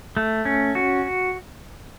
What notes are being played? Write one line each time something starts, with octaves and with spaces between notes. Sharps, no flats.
A3
C#4
F#4